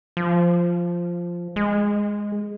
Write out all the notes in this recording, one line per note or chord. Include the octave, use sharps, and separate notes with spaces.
F3
G#3